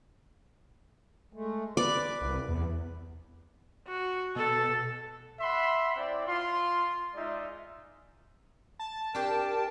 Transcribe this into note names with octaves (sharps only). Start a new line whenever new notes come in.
G#3 A3
B4 D5 D6
C2
E2
F#4
B2 A4
E5 F#5 B5 C6
C4 E4 D5
F4 C6
G#3 D#4 F4 D5 E5
A5
D4 G4 A#4 G5 A5